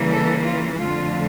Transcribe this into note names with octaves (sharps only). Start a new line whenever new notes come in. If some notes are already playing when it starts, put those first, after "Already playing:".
Already playing: C#3 E3 G3 A#3
A4
F4
F2 D3 A3 F4